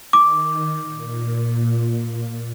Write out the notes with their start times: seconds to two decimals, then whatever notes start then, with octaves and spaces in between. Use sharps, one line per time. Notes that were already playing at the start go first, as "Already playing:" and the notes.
0.13 D#3 D6
0.82 A#2